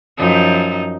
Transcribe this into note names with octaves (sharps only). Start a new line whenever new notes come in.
F#2 F3 D#4